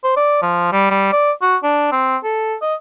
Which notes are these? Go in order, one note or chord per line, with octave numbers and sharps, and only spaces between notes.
C5
D5
F3
G3
G3
D5
F#4
D4
C4
A4
D#5